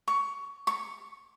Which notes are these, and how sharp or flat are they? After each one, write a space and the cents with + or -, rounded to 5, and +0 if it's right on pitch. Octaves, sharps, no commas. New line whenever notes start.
C#6 +15
C#6 +0